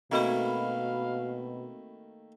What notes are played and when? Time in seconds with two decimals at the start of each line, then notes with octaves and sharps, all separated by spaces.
0.12 B2 D#3 A3 A#3 C4 F#4 F5 B5